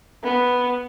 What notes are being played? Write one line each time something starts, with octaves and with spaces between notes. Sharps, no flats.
B3